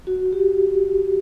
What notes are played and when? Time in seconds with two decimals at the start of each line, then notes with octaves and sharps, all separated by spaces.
0.07 F#4
0.33 G4